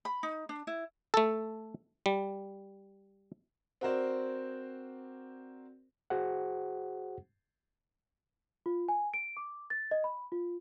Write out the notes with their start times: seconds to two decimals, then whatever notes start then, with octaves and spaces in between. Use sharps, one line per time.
0.05 B5
0.23 D#4
0.49 D4
0.67 E4
1.14 A3 A4
2.06 G3
3.81 C4 F#4 A#4 C5 D5
6.10 F#4 G#4 C5 F#5
8.66 F4
8.89 G#5
9.14 D7
9.37 D6
9.70 A6
9.91 D#5
10.04 B5
10.32 F4